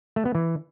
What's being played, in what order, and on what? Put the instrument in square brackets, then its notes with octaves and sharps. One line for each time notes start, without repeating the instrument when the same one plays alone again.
[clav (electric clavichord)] A3
B3
E3